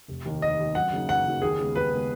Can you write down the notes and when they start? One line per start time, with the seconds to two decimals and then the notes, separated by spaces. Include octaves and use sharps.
0.08 F1
0.25 D#2 D#3
0.42 F1 D#5
0.59 D#2 D#3
0.75 F#2 F#5
0.93 C#3 F#3 A#3 D#4
1.09 F#2 F#5
1.26 C#3 F#3 A#3 D#4
1.42 D#2 G#4
1.59 C#3 G#3 B3
1.75 D#2 B4
1.92 C#3 G#3 B3